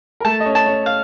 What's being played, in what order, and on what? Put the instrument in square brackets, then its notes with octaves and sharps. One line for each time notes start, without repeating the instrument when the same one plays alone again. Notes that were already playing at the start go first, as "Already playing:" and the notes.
[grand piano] A#4
[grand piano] A3 A4 [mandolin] A5
[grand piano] D#5
C#4 C#5
[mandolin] A5
[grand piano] C#4 C#5
[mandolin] F5